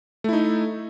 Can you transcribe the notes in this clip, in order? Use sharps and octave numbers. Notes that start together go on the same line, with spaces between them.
A3 D#4 E4